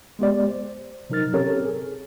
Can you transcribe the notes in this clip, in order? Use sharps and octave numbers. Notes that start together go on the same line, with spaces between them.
G#3 B3 G4 D5
C5
C3 F#3 D#4 A#4 F6 A6
C4 C#4 G4 A4 A#4 C#5
G#4